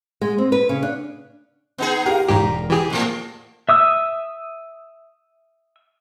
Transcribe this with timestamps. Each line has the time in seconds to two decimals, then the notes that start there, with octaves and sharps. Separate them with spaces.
0.21 G#3
0.38 C4
0.52 B4
0.69 C#3
0.83 D4
1.78 B3 D#4 G#4
2.06 G4 A#4 F5
2.29 E1 G#2 G4 A#5
2.70 E3 G4 G#4
2.90 F2 A2 A#3
3.69 E5 D#6 E6